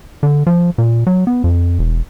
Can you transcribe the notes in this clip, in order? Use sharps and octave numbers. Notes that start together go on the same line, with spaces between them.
D3
F3
A#2
F#3
B3
F2
E1